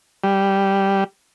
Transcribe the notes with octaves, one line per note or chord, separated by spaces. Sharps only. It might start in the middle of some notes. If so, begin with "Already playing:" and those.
G3